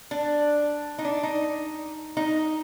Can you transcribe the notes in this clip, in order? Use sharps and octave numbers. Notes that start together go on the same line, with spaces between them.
D4
D#4
D4
D#4
D#4